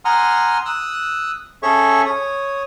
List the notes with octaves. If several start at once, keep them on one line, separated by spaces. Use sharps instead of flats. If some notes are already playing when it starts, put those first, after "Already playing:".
F#5 G#5 A#5 C6 D#6 F6
D#6 E6 F#6
C#4 G#4 A4 C#5 E5 C#6
C#5 D#6